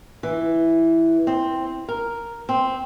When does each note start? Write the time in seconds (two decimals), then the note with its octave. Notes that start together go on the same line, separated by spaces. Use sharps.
0.23 E3
1.27 C4
1.88 A#4
2.49 C4